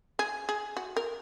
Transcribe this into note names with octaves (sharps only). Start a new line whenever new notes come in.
G#4
G#4
F#4
A#4